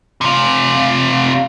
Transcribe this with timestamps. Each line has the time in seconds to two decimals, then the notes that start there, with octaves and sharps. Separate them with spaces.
0.21 C3 F4